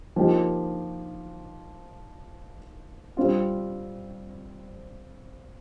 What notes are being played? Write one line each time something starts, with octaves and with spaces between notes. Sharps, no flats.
F3 A#3 D#4 G4
G3 C4 F4